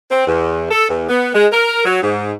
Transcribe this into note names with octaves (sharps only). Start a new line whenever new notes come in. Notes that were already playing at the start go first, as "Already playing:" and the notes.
C4
E2
A4
E2
B3
G#3
A#4
F#3
G#2